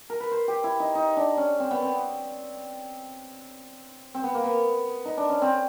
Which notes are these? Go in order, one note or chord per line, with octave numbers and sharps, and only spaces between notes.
A#4
B4
C5
G4
E4
D#4
D#4
D4
C#4
C4
B3
C4
C4
B3
A#3
B3
D#4
D4
C#4
C4